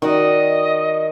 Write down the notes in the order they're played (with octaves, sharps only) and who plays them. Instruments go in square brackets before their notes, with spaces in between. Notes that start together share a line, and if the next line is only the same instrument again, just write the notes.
[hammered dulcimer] D#3 [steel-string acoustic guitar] F#4 D5 [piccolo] D#5